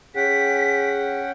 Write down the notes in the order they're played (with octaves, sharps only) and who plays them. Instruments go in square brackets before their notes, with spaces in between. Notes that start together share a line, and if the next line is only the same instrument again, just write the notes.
[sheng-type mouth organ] C#4 F#5 G5 [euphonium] G#4 [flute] B6